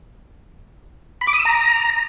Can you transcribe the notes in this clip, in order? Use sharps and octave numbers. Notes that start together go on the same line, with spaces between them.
B5
D6
D#6
E6
A#5